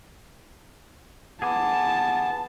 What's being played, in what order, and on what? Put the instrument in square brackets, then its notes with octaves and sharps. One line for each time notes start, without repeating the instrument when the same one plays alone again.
[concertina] B3 [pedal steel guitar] G#4 G#5 D6 [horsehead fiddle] A5